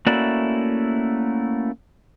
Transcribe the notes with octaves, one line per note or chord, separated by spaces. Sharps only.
A3 A#3 C#4 E4 F#4 D5